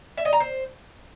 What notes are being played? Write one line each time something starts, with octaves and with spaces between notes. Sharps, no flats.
E5
D#5
A#5
C5